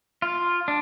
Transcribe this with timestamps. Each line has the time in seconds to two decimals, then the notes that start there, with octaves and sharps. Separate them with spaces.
0.22 F4
0.68 D4